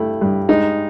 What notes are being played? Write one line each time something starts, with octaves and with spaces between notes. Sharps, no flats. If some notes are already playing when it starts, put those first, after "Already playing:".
Already playing: G2 A3 E4
G2
G#3 D#4